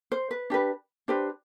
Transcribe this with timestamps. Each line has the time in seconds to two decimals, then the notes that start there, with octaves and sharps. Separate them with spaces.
0.12 C5
0.31 B4
0.50 D4 G4 B4
1.08 D4 G4 B4 C5